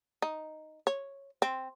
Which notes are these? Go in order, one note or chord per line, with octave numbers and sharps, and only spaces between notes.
D#4
C#5
C4